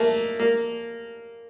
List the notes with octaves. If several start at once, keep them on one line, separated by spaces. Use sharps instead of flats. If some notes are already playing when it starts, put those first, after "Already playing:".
Already playing: A3 A#3
A#3